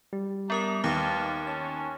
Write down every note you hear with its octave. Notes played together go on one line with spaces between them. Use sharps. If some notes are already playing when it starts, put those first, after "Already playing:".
G3
B3 D4 A#4 A5 A#5 D#6
D#2 B3 F5 A5 D6
C#4 A5